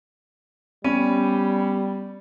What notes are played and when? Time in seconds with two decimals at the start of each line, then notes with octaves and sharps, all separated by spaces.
0.85 G3 B3 C#4